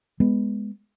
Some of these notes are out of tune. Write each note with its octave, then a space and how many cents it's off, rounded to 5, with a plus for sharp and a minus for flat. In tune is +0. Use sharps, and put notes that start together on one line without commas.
G#3 +0 B3 +0